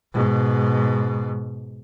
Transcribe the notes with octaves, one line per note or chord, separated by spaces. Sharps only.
G#2 B2